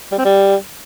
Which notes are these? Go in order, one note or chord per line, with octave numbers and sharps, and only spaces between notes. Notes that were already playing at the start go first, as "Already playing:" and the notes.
G3
C4
G3